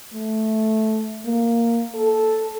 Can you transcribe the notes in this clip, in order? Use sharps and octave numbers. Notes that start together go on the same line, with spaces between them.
A3
A#3
A4